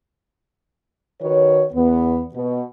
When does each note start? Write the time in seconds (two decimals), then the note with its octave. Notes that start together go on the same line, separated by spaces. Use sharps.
1.21 D#3 F#4 B4 C#5
1.73 E2 B3
2.33 B2